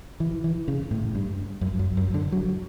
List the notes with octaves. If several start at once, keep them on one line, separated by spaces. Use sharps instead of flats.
E3
E3
C#3
A2
G2
F#2
F#2
F#2
D3
F#3